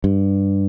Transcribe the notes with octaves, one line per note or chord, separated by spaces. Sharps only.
G2